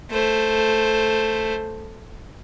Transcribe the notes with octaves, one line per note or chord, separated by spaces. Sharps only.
A3 C5